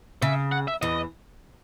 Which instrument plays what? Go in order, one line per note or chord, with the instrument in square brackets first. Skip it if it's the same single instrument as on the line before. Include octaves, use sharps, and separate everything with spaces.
[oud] C#3 [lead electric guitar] E5
[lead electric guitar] F#5
E5
[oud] E2 E3 [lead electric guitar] D#5